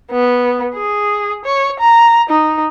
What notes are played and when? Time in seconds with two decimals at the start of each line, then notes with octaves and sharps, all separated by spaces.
0.11 B3
0.75 G#4
1.44 C#5
1.79 A#5
2.29 D#4